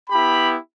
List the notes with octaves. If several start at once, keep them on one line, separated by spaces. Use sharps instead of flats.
B3 E4 G4 B5